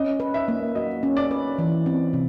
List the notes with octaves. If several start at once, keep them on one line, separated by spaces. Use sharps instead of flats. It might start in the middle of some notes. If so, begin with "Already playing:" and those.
Already playing: C#4 D#5
B4
E5
A#3
F#4 D#5
C#4
D5
B4
E3
C4
C3